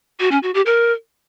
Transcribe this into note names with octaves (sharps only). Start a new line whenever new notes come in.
F#4
C#4
F#4
G4
A#4